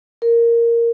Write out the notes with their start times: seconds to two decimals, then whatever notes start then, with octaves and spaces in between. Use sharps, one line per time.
0.22 A#4